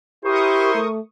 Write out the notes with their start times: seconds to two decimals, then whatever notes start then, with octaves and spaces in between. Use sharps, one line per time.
0.25 E4 G4 A#4 C5 C#6 D#6
0.75 A3